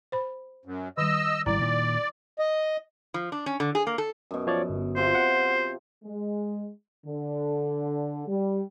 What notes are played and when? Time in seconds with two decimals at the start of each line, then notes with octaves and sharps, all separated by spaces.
0.12 C5 B5
0.65 F#2
0.98 D#3 G3 D#5 E6
1.46 G#1 G3 E4 D5 A#5
1.60 A#2 D#3
2.39 D#5
3.14 F3
3.32 D4
3.46 C#4
3.60 D3
3.75 G#4
3.87 A#3
3.98 A4
4.31 F#2 B2
4.47 F3 C#5 D5
4.69 G1
4.96 C3 F4 C5
5.15 F#5
6.04 G#3
7.06 D3
8.28 G3